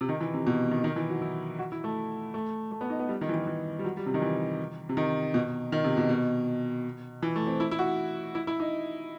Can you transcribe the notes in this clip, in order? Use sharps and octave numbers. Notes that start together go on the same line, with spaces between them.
C3
D#3
E3
C3
B2
D#3
D#3
E3
F#3
E4
F#4
E4
A3
A3
A3
B3
D#4
B3
G3
D#3
E3
D#3
E3
G3
F#3
G3
C3
D#3
E3
C3
D#3
B2
D#3
C3
B2
B2
E3
A3
C4
E4
E4
F#4
E4
E4
D#4